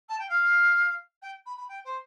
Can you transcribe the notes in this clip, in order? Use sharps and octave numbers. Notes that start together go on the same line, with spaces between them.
A5
G5
F5
G5
B5
B5
G5
C5